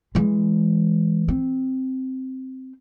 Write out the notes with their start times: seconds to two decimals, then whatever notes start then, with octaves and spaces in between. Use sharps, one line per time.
0.15 E3 G#3
1.28 C4